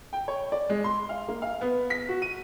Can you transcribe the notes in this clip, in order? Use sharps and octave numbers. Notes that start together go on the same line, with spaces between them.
G5
C#5
D5
G#3
C6
F5
A#3
F5
B3
B6
F#4
D#7